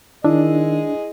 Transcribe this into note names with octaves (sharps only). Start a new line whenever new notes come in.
D#3 D4 E4 G#4 D#5